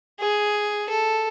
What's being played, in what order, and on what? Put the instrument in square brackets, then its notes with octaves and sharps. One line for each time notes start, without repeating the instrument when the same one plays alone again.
[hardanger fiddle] G#4
A4